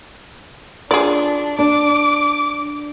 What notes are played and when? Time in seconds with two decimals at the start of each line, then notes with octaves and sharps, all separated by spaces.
0.91 D4 F4 G#4 D5
1.59 D4 D6